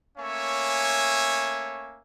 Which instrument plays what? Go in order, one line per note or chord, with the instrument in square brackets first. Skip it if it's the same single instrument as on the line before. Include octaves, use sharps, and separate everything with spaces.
[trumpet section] A3 A#3 C#4 C#5 E5 G#5